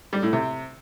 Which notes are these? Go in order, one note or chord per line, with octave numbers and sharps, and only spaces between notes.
G3
A2
C3